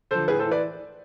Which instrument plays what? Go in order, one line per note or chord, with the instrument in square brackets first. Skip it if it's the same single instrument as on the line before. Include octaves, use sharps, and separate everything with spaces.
[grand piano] D3 F3 A4 C5
A2 G#4 B4
A4 C5
E3
B4 D5